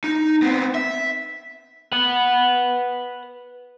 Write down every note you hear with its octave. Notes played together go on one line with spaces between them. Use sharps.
D#4
B3 C4
E5
B4 F#5